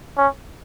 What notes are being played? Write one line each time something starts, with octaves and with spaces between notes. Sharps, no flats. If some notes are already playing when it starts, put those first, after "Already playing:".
C#4